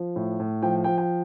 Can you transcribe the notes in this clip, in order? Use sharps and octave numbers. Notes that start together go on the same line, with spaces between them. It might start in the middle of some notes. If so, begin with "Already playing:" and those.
Already playing: F3
A2
A2
F3 G5
F3 G5
G5